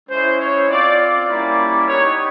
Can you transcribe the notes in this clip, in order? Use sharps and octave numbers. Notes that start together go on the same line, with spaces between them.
G#3 C#4 E4 C5
C#5
C4 F4 D5
D5
G3 A#3 C#4 E4
B3 D#4 G4 C#5